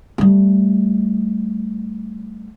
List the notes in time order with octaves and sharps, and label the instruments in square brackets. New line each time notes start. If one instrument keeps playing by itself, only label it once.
[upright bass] G3 A3